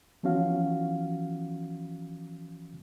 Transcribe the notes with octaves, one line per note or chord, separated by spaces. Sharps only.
E3 F3 B3 C#4 F#4 F5